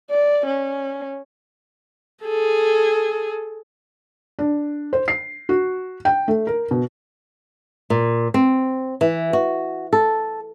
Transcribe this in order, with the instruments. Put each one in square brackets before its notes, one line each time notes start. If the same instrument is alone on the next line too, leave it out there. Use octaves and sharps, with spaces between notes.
[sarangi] D5
C#4
[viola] G#4 A4
[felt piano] D4
C5
C7
F#4
G5
A3
A#4
B2
[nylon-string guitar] A#2
C4
E3
F#4
A4